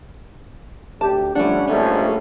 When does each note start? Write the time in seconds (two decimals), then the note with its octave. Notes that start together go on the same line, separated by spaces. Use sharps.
1.01 D2 G4 A5
1.35 D3 F3 G3 A3 C#4 D4 F#5
1.67 A#1 G#2 A3 C#4